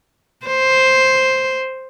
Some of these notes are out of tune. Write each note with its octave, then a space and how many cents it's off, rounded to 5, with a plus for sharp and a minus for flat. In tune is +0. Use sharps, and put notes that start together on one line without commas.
C5 +0